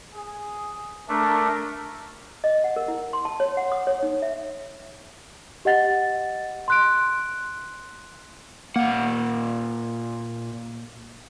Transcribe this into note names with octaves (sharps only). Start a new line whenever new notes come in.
G#4
A3 D4 A#4
D#5
F#5
A#4
E4
C6
A5
C#5
F#5
D#6
C#5
D#4
E5
G4 D#5 F#5 A6
C6 F#6 D7
A#2 A#3 F#5